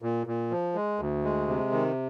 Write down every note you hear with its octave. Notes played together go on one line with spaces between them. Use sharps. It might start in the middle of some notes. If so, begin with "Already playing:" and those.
A#2
A#2
F3
G#3
D2
G#3
C3
D#3